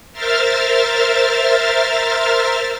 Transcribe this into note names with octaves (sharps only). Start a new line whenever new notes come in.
A#4 C5 E5 F6 A6